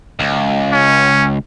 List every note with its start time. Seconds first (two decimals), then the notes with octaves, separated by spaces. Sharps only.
0.19 C#2
0.72 C#4